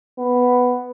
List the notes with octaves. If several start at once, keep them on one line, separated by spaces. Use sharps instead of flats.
B3